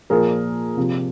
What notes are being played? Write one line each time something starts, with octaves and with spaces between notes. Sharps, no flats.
A#2 F3 G#4 A#4
C3 F3